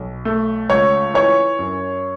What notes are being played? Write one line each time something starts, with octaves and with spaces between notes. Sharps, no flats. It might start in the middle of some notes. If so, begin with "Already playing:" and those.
Already playing: B1
A3
C#2 C#5
E3 C#5
F#2